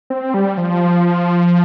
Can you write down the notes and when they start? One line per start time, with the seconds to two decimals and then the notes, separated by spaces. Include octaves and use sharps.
0.10 C4
0.34 G3
0.58 F3